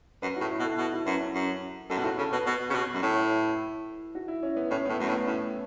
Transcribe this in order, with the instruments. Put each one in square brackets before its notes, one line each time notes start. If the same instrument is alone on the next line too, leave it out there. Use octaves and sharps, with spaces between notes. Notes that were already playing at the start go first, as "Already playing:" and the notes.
[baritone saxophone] F#2 [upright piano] B4
[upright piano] F#4
[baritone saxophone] A2
[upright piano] E4
[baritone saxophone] B2
[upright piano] A4
[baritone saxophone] B2 [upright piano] E4
[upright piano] F#4
[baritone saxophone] F#2 [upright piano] B4
[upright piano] B4
[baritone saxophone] F#2
[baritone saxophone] F#2 [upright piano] A4
[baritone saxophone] B2
[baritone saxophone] A2 [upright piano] F#4
[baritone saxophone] C#3 [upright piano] A4
[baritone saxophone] B2 [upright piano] B4
[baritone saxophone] B2 [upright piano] B4
[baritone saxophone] C#3
B2
F#2
[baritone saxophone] A2 [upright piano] C#5
[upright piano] A4
E4
E4
F#4
E4
C#4
B3
[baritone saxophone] A2 [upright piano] C#4
[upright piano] B3
[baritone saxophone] A2
[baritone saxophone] F#2 [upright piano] A3
[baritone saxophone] A2
[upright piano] B3
[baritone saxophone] A2 [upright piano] C#4